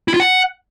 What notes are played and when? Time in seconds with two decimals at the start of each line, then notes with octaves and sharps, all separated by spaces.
0.08 E4
0.14 F4
0.20 F#5